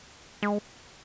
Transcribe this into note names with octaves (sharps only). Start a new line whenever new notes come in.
G#3